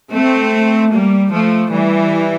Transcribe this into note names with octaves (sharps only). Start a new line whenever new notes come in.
A3 C4
G3 A#3
F3 A3
E3 G3